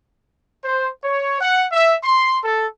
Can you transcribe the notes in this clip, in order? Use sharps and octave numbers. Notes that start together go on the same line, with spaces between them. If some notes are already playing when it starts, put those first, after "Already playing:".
C5
C#5
F#5
E5
C6
A4